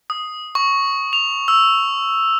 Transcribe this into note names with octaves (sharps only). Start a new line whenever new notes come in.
D#6
C#6
F7
E6